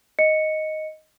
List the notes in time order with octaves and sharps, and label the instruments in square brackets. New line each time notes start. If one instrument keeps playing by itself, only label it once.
[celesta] D#5 C#7